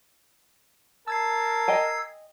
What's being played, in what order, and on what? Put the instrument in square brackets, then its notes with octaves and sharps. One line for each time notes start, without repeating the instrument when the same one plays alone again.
[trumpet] A#4 [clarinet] A5 [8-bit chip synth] E6 G#6 C7
[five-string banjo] D#5 G5 G#5